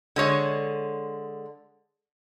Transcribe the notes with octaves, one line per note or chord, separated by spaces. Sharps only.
D3 G#3 C#5